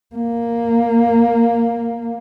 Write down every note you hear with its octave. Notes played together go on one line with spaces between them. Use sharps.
A#3